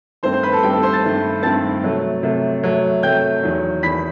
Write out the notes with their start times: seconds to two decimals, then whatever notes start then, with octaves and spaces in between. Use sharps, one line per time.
0.23 G2 D#3 A3 C4 C5 C6
0.33 C5 C6
0.43 B4 B5
0.53 A4 A5
0.63 G2 D#3 A3 C4 G4 G5
0.73 A4 A5
0.83 C5 C6
0.93 A5 A6
1.03 G2 D#3 A3 C4
1.43 G2 D#3 A3 C4 A5 A6
1.83 C3 F#3 A3
2.23 C3 F#3 A3
2.63 C3 F#3 A3
3.03 C3 F#3 A3 G5 G6
3.43 E2 D#3 F#3
3.83 E2 D#3 F#3 B5 B6